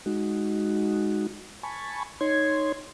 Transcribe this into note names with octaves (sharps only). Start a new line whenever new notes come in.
G#3 D#4 F#4
G#5 A5 B5 C#6
D#4 C#5 C6 G#6